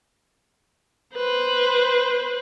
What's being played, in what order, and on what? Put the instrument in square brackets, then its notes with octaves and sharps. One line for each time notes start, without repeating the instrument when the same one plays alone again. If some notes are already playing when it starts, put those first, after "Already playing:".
[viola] B4 C5